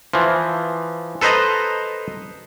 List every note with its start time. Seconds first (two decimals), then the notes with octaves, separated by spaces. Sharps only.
0.13 E3 F3
1.21 A4 B4 C5 D#5 A#5